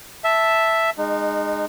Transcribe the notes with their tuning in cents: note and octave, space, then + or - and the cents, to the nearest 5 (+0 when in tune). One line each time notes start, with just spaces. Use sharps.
E5 +0 A5 +0
G#3 -10 D#4 -30